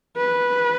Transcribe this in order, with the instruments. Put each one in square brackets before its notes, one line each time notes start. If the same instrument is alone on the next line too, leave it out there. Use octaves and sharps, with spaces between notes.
[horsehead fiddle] B4